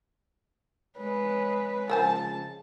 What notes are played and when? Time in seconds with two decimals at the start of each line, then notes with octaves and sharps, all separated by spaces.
0.97 G#3 B4 C#5
1.89 C#3 F3 G#3 A#4 C5 G#5 A5